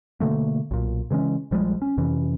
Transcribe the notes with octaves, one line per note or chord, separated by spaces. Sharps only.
B2 D3 A3 A#3
B1 A#2
C#3 E3 G#3 C#4
A#1 F3 G3 G#3
C#4
F2 C3 E3 C#4